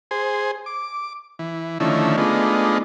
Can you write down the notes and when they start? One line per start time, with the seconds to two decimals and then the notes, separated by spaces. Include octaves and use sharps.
0.11 G#4 C5
0.66 D6
1.39 E3
1.80 D3 D#3 F3 A3 C#4 E4
2.17 G#3 A3 B3 D4 D#4 F4